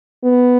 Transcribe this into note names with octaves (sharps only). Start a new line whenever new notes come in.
B3